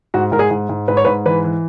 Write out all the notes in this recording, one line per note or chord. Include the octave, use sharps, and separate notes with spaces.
G#2 F#4
G#2 A#4
G#4
G#2
G#2
G#2 B4
C#5
G#2 B4
E3 B4
E3